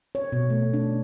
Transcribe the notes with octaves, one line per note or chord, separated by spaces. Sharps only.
C#5
B2
A3
D4